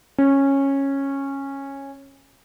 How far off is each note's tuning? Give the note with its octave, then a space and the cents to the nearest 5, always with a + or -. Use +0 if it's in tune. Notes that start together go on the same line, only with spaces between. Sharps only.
C#4 -10